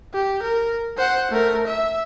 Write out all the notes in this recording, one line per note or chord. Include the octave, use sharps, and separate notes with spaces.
G4
A#4
C5 F#5
A3 A#4
E5